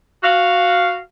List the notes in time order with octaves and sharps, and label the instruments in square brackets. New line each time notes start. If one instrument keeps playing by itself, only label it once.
[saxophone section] F#4 F5